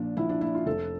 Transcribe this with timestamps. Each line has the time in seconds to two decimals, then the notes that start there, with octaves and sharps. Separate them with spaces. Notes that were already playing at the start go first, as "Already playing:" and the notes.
Already playing: A#1 A#2 D4
0.17 A#1 E4
0.29 D4
0.41 A#2 E4
0.55 F4
0.66 F1 A4